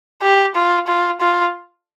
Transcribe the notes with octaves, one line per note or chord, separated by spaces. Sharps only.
G4
F4
F4
F4